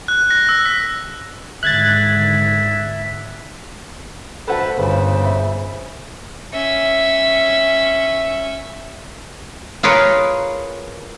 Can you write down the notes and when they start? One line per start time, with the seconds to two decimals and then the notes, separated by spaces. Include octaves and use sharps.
0.08 F#6
0.30 A#6
0.49 E6
0.66 B6
1.63 G#2 D3 D#3 E5 F#6 G#6 A6
4.47 D2 A4 B4 C5 F#5 A5
4.77 G1 A#2 C#3 B4
5.23 E5 B5
6.53 C#4 E5
9.83 F4 G#4 A#4 B4 C#5